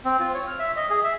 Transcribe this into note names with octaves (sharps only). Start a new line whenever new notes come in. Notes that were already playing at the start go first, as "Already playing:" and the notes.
C4
F4
C#5
F6
E5
D#5
G#4
E5